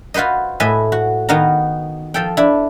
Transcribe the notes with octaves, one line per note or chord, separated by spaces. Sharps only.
F4 F#4 B4 C5 D#5
A2 B4 D#5 E5 G#5
F#4
D#3 B3 D#4 F#4 F5 A#5
F3 A4 G5
D4 E4